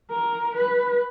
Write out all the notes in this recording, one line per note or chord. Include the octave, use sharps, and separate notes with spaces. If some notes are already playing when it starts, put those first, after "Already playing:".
A#4
B4